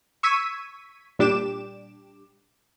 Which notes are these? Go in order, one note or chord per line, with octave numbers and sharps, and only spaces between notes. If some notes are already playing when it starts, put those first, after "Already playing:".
C#6 E6 G#6 B6 D#7
A#2 G3 D4 G4 D6 E7